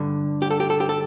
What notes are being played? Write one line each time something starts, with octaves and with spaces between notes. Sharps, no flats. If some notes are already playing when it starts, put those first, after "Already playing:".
Already playing: G2 D3
G4
A4
G4
A4
G4
A4